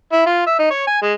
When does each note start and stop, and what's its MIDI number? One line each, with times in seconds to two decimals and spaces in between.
0.12 0.25 64
0.27 0.42 65
0.47 0.56 76
0.59 0.68 63
0.71 0.86 73
0.87 1.01 80
1.02 1.13 56